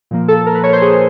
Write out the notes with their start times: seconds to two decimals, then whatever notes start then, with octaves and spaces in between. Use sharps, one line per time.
0.11 A#2 F3 A#3
0.28 A4
0.46 A#4
0.55 B4
0.63 C#5
0.73 C5
0.82 G#4